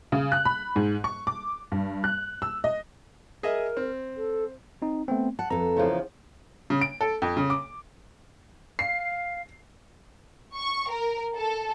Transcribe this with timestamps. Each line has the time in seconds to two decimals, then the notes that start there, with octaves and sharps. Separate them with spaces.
0.12 C#3
0.32 F#6
0.45 B5
0.76 G#2
1.04 C#6
1.27 D6
1.72 G2
2.04 F#6
2.42 E6
2.64 D#5
3.43 G#4 A#4 D#5 E5
3.77 C4
4.16 A4
4.82 C4 D#4
5.08 A3 B3 C4
5.39 F#5 A5
5.50 F2 A4 B4 A#5
5.76 E2 C#3 F3
6.70 C#3
6.81 D7
7.01 A4
7.22 F2
7.37 C#3
7.50 D6
8.79 F5 C7
10.55 C#6
10.90 A#4
11.35 A4